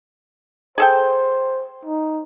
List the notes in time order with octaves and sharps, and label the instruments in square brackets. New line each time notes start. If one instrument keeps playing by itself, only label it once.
[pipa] G#4 A4 G5 [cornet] C5
[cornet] D#4